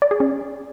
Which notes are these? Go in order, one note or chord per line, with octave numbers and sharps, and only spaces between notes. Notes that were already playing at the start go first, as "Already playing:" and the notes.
D5
G#4
C#4